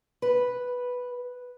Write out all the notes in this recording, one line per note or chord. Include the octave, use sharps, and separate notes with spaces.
B4